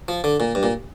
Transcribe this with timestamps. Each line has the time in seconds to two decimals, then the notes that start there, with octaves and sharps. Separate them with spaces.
0.08 F3
0.24 D3
0.40 A#2
0.55 G2
0.63 A#2